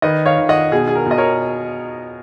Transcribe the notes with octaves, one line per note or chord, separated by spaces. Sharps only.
D#3 B4 D#5
C#5 F5
D#3
D#5 F#5
B2 G#4
G#4
A#4
B2 D#5
A#4 C#5